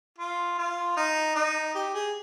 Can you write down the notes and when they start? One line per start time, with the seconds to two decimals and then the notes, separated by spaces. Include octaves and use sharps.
0.18 F4
0.58 F4
0.97 D#4
1.36 D#4
1.75 G4
1.94 G#4